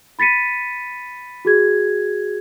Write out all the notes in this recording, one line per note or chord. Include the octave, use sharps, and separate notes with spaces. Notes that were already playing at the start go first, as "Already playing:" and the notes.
B5 A6 B6 C#7 D#7
F#4 G#4 G#6